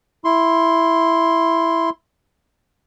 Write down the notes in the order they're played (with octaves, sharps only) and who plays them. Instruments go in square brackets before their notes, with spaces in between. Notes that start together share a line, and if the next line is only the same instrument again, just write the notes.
[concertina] E4 C6